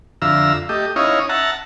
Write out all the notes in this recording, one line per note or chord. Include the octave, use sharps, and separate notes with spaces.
F2 D3 E5 F5 A#5 E6
A3 G4 D#5
C#4 D#4 E4 C#5 D#5 F5
E5 F#5 A5 A#5